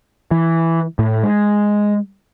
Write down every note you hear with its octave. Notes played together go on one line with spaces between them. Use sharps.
E3
A2
G#3